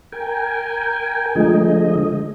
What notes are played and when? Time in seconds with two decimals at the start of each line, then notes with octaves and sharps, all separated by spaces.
0.12 A#4 G5 G#5
1.35 D3 F3 G#3 A3 D#5